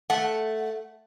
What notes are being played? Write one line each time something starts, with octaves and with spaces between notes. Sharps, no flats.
A3 F#5